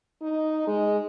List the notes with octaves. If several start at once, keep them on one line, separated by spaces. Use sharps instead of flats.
D#4
G#3